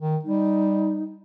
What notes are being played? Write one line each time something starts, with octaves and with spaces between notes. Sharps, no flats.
D#3
G3 D#4